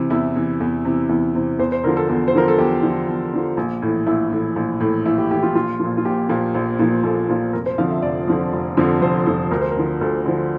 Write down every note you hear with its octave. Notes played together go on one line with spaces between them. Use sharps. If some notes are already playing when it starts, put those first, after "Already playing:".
Already playing: C3 E3
E2 E4
C3 E3
E2
C3 E3
E2 E4
C3 E3
E2 C5
C5
D3 F3 A#4
A4
E2 A4
C5
D3 F3 A#4
A4
E2 G4
D3 F3
E2
D3 F3
A#1
A2 E3
A#1 E4
A2 E3
A#1
A2 E3
A#1 E4
G4
A2 E3 G4
F4
A#1 F4
A#2 F3
F4
A#1 G4
A#2 F3
A#1
A#2 F3
A#1 A4
A#2 F3
F1 A#4
C5
F2 D3 F3 F5
E5
F1 D5
F2 D3 F3
F1
F2 D3 F3
F1 C5
F2 D3 F3 A4
D2 A#4
C5
A#4
D3 F3
D2 A4
D3 F3